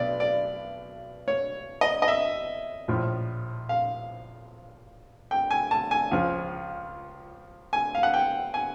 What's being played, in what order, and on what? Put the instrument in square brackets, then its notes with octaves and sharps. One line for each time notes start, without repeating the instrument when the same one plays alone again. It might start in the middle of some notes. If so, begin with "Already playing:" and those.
Already playing: [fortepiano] B1 B2 D5
D5
C#5
D#5
D#5
E5
A#1 A2 F3
F5
G5
G#5
A5
G#5
C#2 C#3 F3
G#5
F5
F#5
G5
G#5